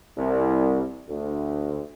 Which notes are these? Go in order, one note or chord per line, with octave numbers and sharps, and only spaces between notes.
C2
D2